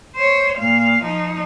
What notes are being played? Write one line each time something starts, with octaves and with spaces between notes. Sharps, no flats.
C5 C#5
A#2 F5
F3 D#4